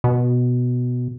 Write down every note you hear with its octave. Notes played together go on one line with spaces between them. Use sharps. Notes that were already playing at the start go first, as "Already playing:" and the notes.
B2